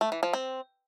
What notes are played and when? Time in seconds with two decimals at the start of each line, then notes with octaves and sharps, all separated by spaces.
0.01 A3
0.12 E3
0.23 F3
0.33 C4